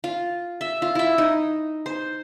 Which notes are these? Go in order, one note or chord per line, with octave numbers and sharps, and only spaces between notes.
F4
E5
F4
E4 E5
D#4
C5